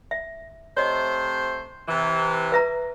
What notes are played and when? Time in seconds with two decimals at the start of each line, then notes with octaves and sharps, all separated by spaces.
0.11 E5
0.77 C3 A3 C5 C#5 D#5
1.88 C3 E3
2.52 B4 E5 A#5